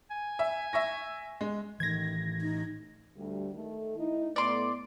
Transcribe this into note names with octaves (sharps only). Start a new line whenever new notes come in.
G#5
E5
E5 C#6 A#6
G#3
A2 D#3 E3 G#6 A#6
D#4
D2 G3
D#3 A3 A4
D#4 E4
A2 A3 B3 D5 C6